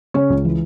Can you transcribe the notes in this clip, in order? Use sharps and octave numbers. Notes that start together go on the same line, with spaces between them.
C#3 C#4 C#5
C#2
E3